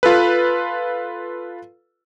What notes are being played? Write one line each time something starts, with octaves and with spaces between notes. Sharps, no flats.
F4 A4 B4